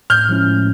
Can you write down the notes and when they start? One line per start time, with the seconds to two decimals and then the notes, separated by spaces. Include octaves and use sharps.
0.10 A2 F6 G6
0.29 F3 G#3 C#4 E4
0.47 A2